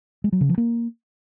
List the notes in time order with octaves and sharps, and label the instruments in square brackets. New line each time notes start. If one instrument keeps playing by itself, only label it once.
[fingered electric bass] G#3
F#3
C#3
F3
A#3